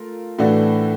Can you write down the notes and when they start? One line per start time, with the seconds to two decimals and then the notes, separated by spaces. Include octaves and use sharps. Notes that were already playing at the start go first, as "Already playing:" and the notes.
Already playing: A3 F4 A#4
0.38 A2 E3 A3 D4 F#4